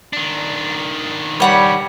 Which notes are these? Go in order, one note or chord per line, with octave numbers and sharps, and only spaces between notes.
D#3 D4
G3 C#5 F#5 B5